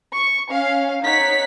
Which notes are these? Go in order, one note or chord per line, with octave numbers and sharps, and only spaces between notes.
C#6
C#4 F5
D#4 C#5 F#5 B6